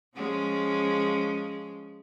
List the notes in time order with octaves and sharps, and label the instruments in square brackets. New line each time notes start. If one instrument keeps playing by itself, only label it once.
[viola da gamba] F3 G#3 C#4